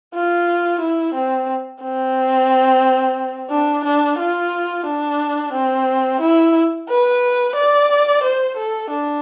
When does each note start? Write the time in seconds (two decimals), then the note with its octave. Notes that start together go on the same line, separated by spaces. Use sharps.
0.14 F4
0.81 E4
1.14 C4
1.82 C4
3.50 D4
3.85 D4
4.19 F4
4.86 D4
5.53 C4
6.21 E4
6.89 B4
7.55 D5
8.23 C5
8.57 A4
8.90 D4